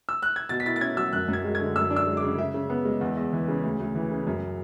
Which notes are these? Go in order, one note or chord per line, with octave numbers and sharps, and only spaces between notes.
E6
F#6
G#6
B2 A6
B6
E4 A6
A6
C#4 G#6
F#3 E6
F#2 F#6
F#2
G#6
G#3
D3 G#6
F#2 E6
D4
E6
G#3
D6
C#3
C#3 E5
C#3
B3
G#3
E2
E2
E3
C#3
D2
D2
E3
C#3
F#2